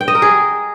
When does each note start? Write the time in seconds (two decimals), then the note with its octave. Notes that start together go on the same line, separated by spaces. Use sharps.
0.01 G5
0.08 D#5
0.15 A#4
0.22 G#4